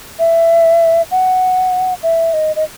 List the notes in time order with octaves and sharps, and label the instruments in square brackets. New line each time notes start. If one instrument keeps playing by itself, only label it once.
[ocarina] E5
F#5
E5
D#5
D#5